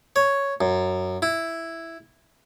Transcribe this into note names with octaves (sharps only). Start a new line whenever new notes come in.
C#5
F#2
E4